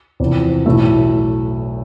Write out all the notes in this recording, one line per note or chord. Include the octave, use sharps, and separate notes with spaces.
E2 C3 F3
B1 A2 E3 A3 E4